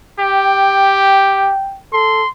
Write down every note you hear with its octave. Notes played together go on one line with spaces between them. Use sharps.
G4 G5
A4 C6